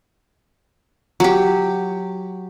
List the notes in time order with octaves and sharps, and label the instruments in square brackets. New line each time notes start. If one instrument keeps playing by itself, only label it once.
[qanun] F#3 G4